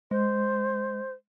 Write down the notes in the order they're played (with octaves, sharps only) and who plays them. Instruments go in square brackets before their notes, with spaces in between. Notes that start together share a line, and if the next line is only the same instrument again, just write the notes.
[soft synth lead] G#3 [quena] C5